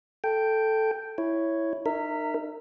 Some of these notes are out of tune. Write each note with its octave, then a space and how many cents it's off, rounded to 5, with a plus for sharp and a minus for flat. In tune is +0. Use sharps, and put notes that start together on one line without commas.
A4 +0 G5 +0
E4 +0 C#5 +0
D#4 -35 A#4 -20 E5 +0